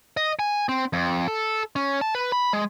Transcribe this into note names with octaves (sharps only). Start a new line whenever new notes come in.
D#5
G#5
C4
F2
A4
C#4
A5
B4
B5
G#3